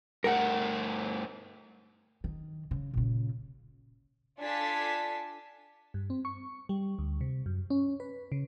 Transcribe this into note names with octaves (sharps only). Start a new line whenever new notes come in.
G2 A3 A#4 F#5
D#3
C#3
A#2 C#3
D4 F4 A4 G#5 A5 B6
G2
C4
C#6
G3
D2
C3
F#2
C#4
B4
C#3